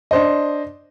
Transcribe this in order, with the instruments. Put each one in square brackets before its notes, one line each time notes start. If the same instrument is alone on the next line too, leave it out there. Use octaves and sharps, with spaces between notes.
[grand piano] D4 C5 D#5